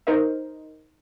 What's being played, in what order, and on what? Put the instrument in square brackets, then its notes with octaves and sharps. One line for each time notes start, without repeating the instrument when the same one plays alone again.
[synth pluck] D#4 A#4 C5 D#5